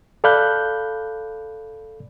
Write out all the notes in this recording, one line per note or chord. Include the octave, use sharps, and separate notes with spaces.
A4 D5 F5 B5 F#6 G6